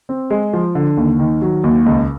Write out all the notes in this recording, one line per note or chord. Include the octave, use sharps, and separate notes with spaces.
C4
G#3
F3
D3
D#2
D#3
F#3
D#2
C#2